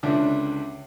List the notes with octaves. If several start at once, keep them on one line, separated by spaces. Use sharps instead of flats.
C#2 D3 D4 E5